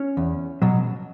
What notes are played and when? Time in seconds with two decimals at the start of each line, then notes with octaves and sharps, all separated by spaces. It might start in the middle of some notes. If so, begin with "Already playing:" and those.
Already playing: C#4
0.17 E2
0.62 B2 F#3